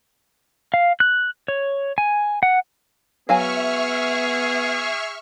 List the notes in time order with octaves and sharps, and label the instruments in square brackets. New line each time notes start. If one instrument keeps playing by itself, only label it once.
[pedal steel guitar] F5
F#6
C#5
G#5
F#5
[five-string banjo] F#3 F5 G#5 [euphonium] B3 [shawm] G#4 [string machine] E5 C#6 F6